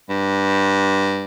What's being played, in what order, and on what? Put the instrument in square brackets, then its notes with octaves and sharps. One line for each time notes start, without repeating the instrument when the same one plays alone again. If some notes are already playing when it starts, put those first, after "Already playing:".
[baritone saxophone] G2